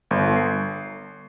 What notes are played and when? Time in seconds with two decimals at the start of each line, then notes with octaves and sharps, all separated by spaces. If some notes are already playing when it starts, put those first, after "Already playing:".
0.11 G1
0.36 C7